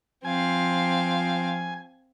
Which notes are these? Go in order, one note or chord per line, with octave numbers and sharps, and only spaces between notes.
F3 C4 F5 G#5